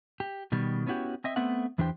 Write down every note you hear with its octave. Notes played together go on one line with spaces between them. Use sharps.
G4
B2 D#3 G3
B3 C#4 E4 F#4 G4
C4 D#5 E5
A3 B3 C4 E5 F#5
E2 E3 D4 G4 C5 G5